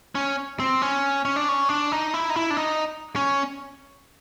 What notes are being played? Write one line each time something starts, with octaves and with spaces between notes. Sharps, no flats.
C#4
C4
C#4
C#4
D4
C#4
D4
D#4
E4
D#4
E4
D4
D#4
C#4